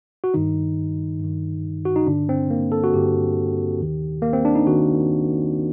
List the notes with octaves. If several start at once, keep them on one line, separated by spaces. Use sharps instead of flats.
F#4
G2 D#3 D#4
G2 D#3
F#4
D#4
G2 D3 D4
C4
A#3
A4
F#4
G2 D3 G4
D#2 D#3
A#3
C4
D4
D#4
D#3 F#4